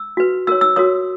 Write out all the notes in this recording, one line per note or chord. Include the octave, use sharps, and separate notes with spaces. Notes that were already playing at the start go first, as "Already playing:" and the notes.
Already playing: E6
F#4 B4
F#4 A#4 C#5 E6
E6
F#4 A#4 C#5 D#6